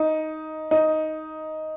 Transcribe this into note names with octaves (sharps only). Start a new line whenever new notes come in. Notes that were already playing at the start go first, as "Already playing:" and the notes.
Already playing: D#4
D#4